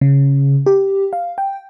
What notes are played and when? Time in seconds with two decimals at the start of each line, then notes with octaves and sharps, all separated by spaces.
0.01 C#3
0.66 G4
1.13 F5
1.38 G5